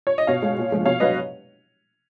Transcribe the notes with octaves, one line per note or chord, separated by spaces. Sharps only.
C#5
D#5
B2 C#5 F5
G#3
A#2
F3 G#3
B2 C#5 F5
F#3 B4 D#5